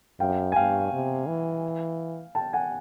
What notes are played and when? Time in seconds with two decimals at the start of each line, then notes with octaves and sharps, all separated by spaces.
0.20 F#2 F5 G5
0.52 G#5
0.56 G2 F5 G5
0.92 C3
1.27 E3
2.35 G5 A5
2.53 F#5 G#5